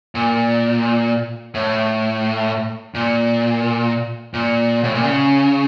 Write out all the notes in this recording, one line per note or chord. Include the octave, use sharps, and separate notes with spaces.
A#2
A2
A#2
A#2
A2
A#2
C#3